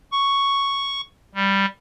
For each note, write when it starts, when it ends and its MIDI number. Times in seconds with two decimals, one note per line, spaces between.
0.12 1.01 85
1.35 1.66 55